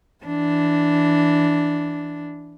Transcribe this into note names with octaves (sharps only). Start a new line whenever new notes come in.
E3 D4